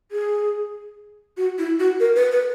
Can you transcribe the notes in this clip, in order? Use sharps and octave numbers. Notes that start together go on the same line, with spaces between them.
G#4
F#4
E4
F#4
A#4
B4
B4